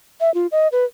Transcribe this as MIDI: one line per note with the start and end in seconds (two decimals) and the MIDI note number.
0.21 0.33 76
0.34 0.47 65
0.52 0.68 75
0.72 0.85 71